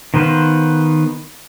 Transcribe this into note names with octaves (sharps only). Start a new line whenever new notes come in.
D#3 B3 B4 C5 F5